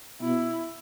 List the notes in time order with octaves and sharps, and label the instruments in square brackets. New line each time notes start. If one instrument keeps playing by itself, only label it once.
[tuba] B2 [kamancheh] E4